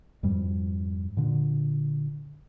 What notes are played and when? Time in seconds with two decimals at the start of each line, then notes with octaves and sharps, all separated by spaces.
0.23 F2 G#2 G3
1.17 A#2 D3